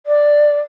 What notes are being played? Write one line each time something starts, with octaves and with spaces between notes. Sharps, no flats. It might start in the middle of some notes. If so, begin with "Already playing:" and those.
D5